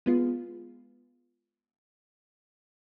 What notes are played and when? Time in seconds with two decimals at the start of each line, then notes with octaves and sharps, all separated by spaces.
0.06 G#3 B3 F4